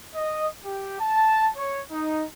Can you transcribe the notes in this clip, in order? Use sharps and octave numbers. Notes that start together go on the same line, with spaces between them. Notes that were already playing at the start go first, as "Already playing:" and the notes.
D#5
G4
A5
C#5
D#4